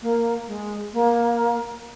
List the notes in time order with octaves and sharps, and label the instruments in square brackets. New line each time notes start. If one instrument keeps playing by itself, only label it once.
[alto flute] A#3
G#3
A#3